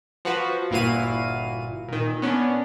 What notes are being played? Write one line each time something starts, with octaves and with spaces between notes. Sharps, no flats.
F3 F#4 B4
G1 A#2 E4 F#4 F5 D#7
A#2 D#3
B3 C#4 D4